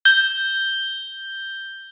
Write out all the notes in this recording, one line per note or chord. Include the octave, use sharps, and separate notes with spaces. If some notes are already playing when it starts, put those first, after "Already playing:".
G6 G7